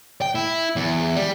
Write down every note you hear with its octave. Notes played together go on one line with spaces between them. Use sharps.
G5
E4
E2
G3